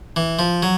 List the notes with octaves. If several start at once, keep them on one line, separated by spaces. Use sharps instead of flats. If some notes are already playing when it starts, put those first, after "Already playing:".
E3
F3
F#3